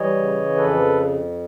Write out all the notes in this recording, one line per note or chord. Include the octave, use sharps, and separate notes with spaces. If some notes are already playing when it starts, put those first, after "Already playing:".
Already playing: E3 G3 C#5 D#5
C#3
F2 A4 B4